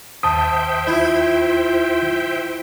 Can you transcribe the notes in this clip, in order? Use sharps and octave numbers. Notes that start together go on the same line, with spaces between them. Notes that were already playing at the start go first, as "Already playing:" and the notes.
D#2 C5 E5 G5 A5 D#6
E4 F4